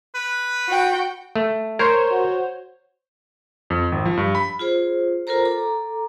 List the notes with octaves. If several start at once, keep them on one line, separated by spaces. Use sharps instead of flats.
B4
F#4 G5
A3
A#4 C5 C#5
F#4
F2
G#1
F3
G2
B5
F4 G#4 C5
F4 A4 A#4 C5 A#5
A4 A#5 D6